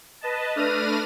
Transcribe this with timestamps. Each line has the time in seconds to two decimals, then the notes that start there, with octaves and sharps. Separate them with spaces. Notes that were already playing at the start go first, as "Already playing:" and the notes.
0.21 B4 D#5 A5
0.56 A3 D4 B4 F6 A#6 D#7